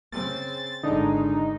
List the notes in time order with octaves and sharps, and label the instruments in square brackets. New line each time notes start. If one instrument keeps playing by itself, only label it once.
[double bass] C#3 C4 [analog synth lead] A6
[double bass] G#1 G#3 [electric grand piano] D3 D4 [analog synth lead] D#4